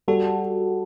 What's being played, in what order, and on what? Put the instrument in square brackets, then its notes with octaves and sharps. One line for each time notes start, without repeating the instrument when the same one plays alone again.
[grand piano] G3 [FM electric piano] F#4 A4